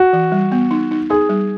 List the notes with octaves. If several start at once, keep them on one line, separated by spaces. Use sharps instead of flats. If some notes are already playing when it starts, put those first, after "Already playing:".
Already playing: F#4
E3
G3
B3
D#4
D#4
D#4 G#4
G3